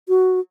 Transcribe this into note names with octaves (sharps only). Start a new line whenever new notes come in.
F#4